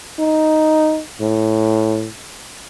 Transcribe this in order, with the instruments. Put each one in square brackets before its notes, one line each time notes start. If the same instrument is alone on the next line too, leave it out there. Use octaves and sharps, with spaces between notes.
[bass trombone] D#4
A2